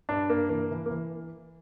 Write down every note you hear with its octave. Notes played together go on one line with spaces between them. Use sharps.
G2 D4
G2 A#3
E3 A#3
E3
A#3
E3